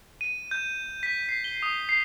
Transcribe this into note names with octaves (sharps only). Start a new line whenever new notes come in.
D#7
G6
B6
C7
G7
D#6
C7